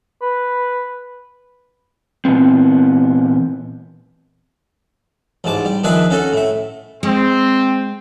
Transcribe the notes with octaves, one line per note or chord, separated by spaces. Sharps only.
B4
A#2 E3 B3 C4
A1 G#2 A5 D6
G3
D#2 F3 D4 G#4 B4 E5
C#4 F#4 A4
A2 E5
G#3 C4